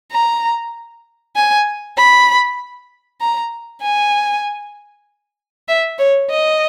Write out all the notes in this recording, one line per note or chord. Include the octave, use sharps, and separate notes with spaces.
A#5
G#5
B5
A#5
G#5
E5
C#5
D#5